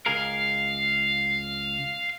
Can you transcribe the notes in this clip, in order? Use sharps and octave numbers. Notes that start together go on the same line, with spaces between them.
C#2 G#4 A#4 F5